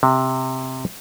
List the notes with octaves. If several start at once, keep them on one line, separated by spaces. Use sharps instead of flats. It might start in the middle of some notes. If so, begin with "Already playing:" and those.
C3